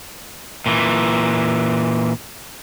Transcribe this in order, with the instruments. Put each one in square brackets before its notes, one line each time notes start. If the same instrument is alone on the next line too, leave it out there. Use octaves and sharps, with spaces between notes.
[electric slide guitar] A#2 E3